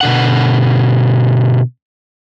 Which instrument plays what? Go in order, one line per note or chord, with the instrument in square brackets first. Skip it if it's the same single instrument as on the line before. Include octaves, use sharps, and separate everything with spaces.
[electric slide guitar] B2 D3 F#5